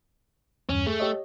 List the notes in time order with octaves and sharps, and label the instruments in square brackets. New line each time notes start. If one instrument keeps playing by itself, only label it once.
[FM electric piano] E2 G2 [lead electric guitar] C#4
[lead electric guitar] A3 [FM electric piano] G#4
[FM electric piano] G4 C#5 D#5